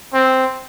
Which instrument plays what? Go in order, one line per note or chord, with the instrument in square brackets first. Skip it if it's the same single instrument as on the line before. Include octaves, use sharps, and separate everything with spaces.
[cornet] C4